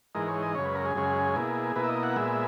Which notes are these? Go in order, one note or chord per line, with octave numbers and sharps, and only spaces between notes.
G#2 E3 G#3 D#4 A#4
C#5
D#5
F#2 C#3 G#3 C#4 C#5
B4
A#4
G#4
F#2 C#3 G#3 C#4
B2 A#3 E4
B2 A#3 E4 B4
E5
D#5
F#5
A#2 G#3 B3 E5